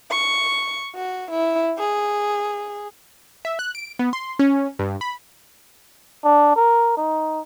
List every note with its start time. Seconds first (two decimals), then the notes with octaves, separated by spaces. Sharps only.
0.11 C#6
0.95 F#4
1.31 E4
1.78 G#4
3.45 E5
3.59 F#6
3.75 D7
3.99 B3
4.13 C6
4.39 C#4
4.79 G2
5.01 B5
6.24 D4
6.56 A#4
6.97 D#4